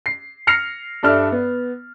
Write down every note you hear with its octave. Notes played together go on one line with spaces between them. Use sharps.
C7
F6 A#6 C7 C#7 F7
G2 D4 A4 E5 F6
B3